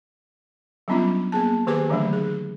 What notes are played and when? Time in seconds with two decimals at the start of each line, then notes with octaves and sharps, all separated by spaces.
0.88 F#3 G3 B3 C#4 D4 F4
1.32 A#3 B3 G#4 A5
1.67 D#3 G4 G#4 B4 G#5 D6
1.89 D3 E3 F#3 A3 D4
2.13 G#4